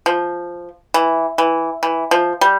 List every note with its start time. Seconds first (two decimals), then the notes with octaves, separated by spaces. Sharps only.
0.06 F3
0.94 E3
1.38 E3
1.83 E3
2.11 F3
2.41 G3